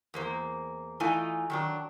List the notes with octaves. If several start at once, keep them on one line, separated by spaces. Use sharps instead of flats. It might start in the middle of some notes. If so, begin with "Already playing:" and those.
E2 A#3 C5
E3 A3 D#4 F4 G#5
D#3 F#3 D4